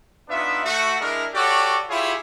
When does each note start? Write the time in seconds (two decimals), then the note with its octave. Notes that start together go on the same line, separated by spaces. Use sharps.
0.29 B3 D4 D#4 F4 E5
0.64 A3 F#4
1.00 G#3 D4 E4 A#4
1.34 F#4 G4 A4 C#5 D5
1.90 E4 F4 G4 G#4 C#5